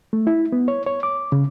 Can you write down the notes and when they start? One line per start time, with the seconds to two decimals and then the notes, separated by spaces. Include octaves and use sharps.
0.13 A3
0.27 E4
0.52 B3
0.68 C#5
0.87 C#5
1.03 D6
1.32 C#3